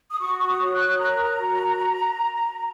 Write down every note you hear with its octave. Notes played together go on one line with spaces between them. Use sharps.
D#6
F#4 C#6
C#6
D#6
C#5
F#6
A#4 A#5
F#4